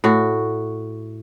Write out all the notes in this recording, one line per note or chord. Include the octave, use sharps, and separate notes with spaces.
A2 F#4